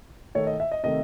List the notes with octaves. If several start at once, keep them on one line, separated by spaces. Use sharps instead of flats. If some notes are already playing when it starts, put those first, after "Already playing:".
D#3 A3 C#5
D#5
E5
D#5
C3 D#3 A3 D#5